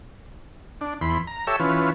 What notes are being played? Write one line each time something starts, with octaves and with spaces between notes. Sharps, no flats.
D4
E2 B5 C6
A#5
G4 A4 C#5 E5 E6
E3 C#4 F4 B4